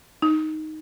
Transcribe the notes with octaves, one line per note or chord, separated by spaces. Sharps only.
D#4